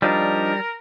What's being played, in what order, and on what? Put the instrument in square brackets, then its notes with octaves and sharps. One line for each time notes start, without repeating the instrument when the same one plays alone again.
[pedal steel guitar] F3 D4 D#4 [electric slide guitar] G3 [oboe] A#4